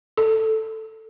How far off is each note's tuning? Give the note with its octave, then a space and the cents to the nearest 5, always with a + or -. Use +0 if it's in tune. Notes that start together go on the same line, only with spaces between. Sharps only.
A4 +5